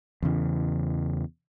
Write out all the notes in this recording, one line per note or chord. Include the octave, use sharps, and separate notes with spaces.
E2 C#3 E3